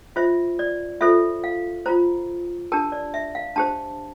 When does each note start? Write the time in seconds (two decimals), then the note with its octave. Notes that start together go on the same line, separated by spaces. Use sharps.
0.16 F4 C5 E5
0.59 D5
1.01 F4 A4 C5 E5
1.44 F5
1.86 F4 C5 A#5
2.72 D4 G4 A#4 A5
2.92 D5
3.14 E5
3.35 F5
3.56 D4 G4 C5 A5